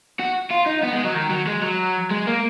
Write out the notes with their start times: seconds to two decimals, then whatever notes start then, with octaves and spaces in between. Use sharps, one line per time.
0.20 F#4
0.51 F4
0.67 D#4
0.83 B3
0.93 G#3
1.04 F#3
1.15 D#3
1.30 F#3
1.47 G#3
1.63 F#3
2.11 G#3
2.27 A#3